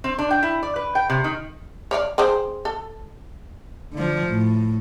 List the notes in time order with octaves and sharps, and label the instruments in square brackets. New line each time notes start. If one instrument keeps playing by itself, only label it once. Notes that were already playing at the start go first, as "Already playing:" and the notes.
[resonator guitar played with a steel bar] C4
D4
G5
E4
D5
B4
G5
C3
D#3
[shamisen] C#5 D5 F5
C4 G#4 C5
A4
[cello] D3 F3
A2